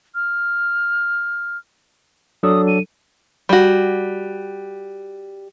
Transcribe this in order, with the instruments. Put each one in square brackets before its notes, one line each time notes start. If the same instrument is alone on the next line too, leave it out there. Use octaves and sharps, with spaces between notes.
[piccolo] F6
[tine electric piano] F#3 D4 A4 [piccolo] D#6
[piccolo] D#7
[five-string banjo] G3 F#4